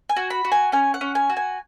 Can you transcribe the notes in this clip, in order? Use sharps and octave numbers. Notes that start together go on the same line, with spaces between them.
G#5
F#4
B5
F#4
G#5
C#4 G#5
F#5
C#4
G#5
F#4
G#5